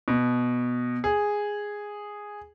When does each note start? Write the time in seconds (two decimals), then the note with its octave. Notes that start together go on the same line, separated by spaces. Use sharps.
0.08 B2
1.04 G#4